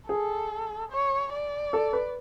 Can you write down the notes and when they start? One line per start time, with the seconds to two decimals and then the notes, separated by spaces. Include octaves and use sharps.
0.09 G#4 A4
0.91 C#5
1.32 D5
1.73 A4
1.93 B4